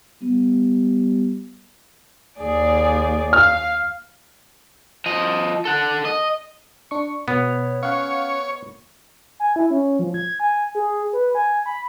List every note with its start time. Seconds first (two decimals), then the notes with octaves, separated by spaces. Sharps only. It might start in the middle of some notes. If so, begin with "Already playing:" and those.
0.22 G3 B3
2.39 D#2 G#4 D5
3.33 F5 F6
5.06 F3 D#5
5.65 A4 F#5
6.05 D#5
6.91 D4 C#6
7.28 B2 B3 C#5
7.83 C#4 C#5 F5 F#5
9.40 G#5
9.56 E4
9.70 C#4
9.99 F3
10.14 G#6
10.40 G#5
10.75 G#4
11.13 B4
11.35 G#5
11.66 B5